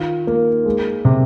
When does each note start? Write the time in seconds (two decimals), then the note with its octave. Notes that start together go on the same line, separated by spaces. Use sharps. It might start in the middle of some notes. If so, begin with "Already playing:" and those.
Already playing: D#3 F4
0.27 A#3
0.66 G#3
1.05 C3